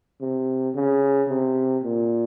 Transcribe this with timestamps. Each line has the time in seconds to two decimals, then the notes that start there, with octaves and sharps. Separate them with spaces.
0.21 C3
0.75 C#3
1.29 C3
1.83 A#2